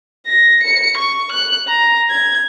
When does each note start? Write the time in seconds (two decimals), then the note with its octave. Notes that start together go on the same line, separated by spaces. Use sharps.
0.27 A#6
0.63 C#7
0.97 C#6
1.33 F#6
1.68 A#5
2.10 G#6